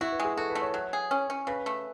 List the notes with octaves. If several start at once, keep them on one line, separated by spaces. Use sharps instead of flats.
E4 F#4
B4
G#3
G#4
F#4 A4
B4
A3
C#5
F#3
G#4
C#4
C#4
C#3 B4
A3